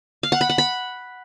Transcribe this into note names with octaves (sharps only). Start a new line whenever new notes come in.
F5
F#5
B5
F#5
B5